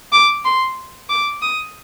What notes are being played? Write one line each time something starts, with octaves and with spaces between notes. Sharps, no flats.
D6
C6
D6
D#6